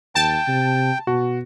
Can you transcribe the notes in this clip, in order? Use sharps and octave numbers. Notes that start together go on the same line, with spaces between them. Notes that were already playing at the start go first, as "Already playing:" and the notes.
D#2 G5 A5
C3
B2 F#4